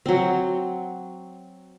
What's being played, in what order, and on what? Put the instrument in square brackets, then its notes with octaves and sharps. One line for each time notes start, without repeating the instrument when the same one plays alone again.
[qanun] F#3 C4